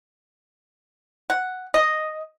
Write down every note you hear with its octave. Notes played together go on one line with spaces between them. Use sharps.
F#5
D#5